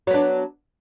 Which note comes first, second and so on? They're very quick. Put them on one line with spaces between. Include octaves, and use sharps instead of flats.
F#3 B3 D4